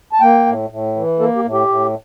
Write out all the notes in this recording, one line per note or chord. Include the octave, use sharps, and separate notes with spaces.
A5
A#3 G5
A2
A2
E3
A#3 A4
G4
A2
G4
A2